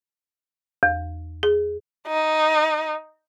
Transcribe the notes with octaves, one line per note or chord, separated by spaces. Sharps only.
E2
G#4
D#4